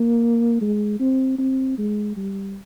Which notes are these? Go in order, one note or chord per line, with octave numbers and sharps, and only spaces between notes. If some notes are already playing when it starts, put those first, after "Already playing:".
Already playing: A#3
G#3
C4
C4
G#3
G3